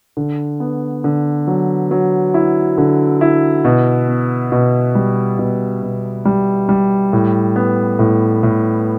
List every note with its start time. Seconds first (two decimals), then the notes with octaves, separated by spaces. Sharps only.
0.17 D3
0.60 B3
1.04 D3
1.47 F#3
1.91 F#3
2.34 E4
2.78 D3
3.21 E4
3.64 B2
4.08 B3
4.52 B2
4.95 G3
5.39 B2
5.82 B2
6.25 G3
6.69 G3
7.13 A2
7.56 B3
7.99 A2
8.43 A2